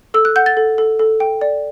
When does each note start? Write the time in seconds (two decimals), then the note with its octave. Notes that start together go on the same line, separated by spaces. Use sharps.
0.14 A4 E6
0.25 F#6
0.36 F#5 G6
0.46 A6
0.57 A4
0.78 A4
0.99 A4
1.20 G5
1.41 D5